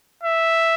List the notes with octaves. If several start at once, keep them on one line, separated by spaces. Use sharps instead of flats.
E5